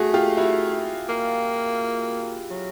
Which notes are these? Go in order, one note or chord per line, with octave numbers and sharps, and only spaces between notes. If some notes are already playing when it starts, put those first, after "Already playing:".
Already playing: A3 F#4 G#4
F4 G4
E4 F#4
A#3
F#3